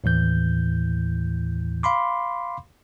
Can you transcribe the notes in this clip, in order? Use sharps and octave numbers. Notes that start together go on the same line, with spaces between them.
D#2 A2 E3 G6
F5 B5 C6 D6